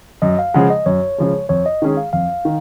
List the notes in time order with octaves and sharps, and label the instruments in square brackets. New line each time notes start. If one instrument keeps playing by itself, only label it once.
[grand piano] F#2 [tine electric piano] D#5
[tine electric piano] F5
[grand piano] C#3 F3 G#3 [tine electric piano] F#5
[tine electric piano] D#5
[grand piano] F#2 [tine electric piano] C#5
[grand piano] C#3 F3 G#3
[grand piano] F2 [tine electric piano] C#5
[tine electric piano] D#5
[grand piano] D#3 G#3 C#4 G#4
[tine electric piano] F5
[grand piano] F2 [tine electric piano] F5
[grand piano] D#3